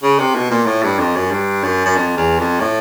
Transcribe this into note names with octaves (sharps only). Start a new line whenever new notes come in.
C#3
C3
B2
A#2
A2
G2
F2
F#2
G2
F#2
F#2
F2
E2
F2
A2